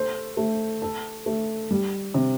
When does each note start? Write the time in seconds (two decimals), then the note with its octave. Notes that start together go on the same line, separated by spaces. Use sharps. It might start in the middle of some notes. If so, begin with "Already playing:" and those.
Already playing: A3 C5
0.37 A3
0.82 A4
1.26 A3
1.71 G3
2.14 C3